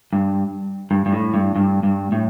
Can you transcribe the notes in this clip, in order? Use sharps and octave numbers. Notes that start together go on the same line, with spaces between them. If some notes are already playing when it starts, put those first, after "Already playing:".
G2
G2
G2
A2
G2
G2
G2
A2